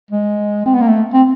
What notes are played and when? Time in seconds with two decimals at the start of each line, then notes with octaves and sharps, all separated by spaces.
0.11 G#3
0.66 C4
0.73 B3
0.81 A#3
0.88 A3
1.13 C4